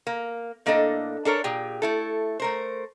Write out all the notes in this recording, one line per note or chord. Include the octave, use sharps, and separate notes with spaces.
A#3
A2 A#3 D4 A4 D#5
D4 A4 A#4 C#5
A#2 G4 G#4 G5
A3 E4 A4
A3 A#4 C5